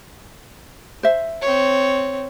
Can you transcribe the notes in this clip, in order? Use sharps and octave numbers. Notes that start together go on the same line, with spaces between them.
C5 E5
C4 C#5